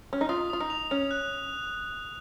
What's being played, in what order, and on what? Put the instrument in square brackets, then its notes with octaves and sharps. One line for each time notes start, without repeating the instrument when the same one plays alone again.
[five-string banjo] C#4
D#4
[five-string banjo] F4 [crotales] D#6
[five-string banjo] F4 [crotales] D#6
[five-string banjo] D#4
[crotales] F7
[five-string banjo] C#4 [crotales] F7
[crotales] F#6